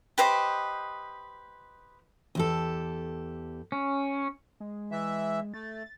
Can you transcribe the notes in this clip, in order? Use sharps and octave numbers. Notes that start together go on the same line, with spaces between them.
G4 B4 C5 D#5
E2 G4 A4
C#4
G#3
E3 E5
A3 A6